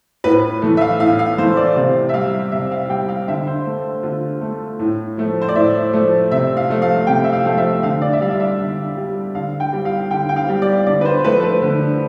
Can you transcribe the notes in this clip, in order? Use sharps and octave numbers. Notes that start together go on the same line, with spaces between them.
A2 B4
E3 A3
E5
F5
A2 F5
F5
E3 A3 C5
D5
C3 F5
E5
G3 F5
C3 E5
F5
G3 G5
F5
D3 E5
C5
A3
D3 F4
A3
A2
F3 A3
C5
D5
A2 E5
F3 A3
C3 E5
F5
F3 A3
F5
C3 G5
E5
F5
F3 A3 F5
E5
D3 F5
D5
E5
G3 F5
D5
E5
D3
G3
D3 F5
G5
G3
F5
D3 G5
G5
F5
G3
D5
D3 D5
B4
C5
F3 A3 B4
B4
D3